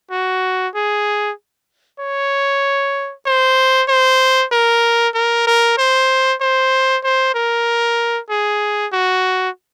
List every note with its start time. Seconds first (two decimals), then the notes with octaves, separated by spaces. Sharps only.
0.11 F#4
0.75 G#4
2.00 C#5
3.26 C5
3.88 C5
4.52 A#4
5.14 A#4
5.47 A#4
5.78 C5
6.41 C5
7.04 C5
7.35 A#4
8.30 G#4
8.93 F#4